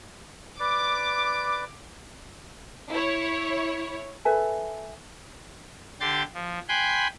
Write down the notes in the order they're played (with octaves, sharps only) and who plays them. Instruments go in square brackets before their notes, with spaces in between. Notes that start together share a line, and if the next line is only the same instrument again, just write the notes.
[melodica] B4 D5 [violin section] D6
[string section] E4 C#5
[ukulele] A4 B4 E5 G#5
[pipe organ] D3 G4 C6 G6 A6
F3
G5 G#5 B5 C6 F#6 G6